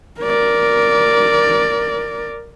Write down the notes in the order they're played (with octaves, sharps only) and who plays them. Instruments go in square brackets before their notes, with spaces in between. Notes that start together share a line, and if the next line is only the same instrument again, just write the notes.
[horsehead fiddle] A#4 D5